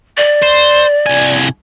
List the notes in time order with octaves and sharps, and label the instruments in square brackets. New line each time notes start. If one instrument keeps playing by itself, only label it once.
[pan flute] D5
[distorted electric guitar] C5
C2 G#5